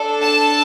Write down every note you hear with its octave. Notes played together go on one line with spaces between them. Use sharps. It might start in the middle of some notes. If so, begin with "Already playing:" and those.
Already playing: D4 A4
A5